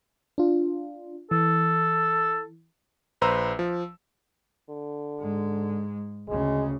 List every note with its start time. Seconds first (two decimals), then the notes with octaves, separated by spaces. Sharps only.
0.38 D4 F4
1.31 E3 A4
3.21 A#1 B4 C5 A#5 E6
3.59 F3
4.70 D3
5.20 G#2 G#3
6.28 D2 C#3 G#3